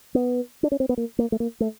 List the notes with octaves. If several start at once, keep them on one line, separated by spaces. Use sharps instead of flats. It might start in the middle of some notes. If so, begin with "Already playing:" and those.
B3
D4
C#4
C4
B3
A#3
A#3
A3
A#3
A3